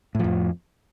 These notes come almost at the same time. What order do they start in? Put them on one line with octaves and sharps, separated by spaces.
A2 F3 F2